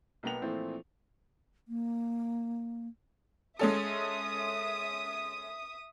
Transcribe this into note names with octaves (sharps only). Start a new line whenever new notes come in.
B1 A#3 B3 G5 F7
A#2 E3 F3 A3 C4
A#3
G#3 C#4 A4 E5 D#6